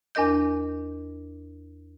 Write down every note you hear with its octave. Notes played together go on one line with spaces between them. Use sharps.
E2 D4 A#4 D#5 G6